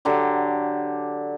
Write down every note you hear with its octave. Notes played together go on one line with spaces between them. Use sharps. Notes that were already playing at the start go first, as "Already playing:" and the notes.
D3 F#3 G4